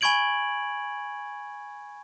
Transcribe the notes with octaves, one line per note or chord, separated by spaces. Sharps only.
G#5 B5 C#6 G#6 D7 F#7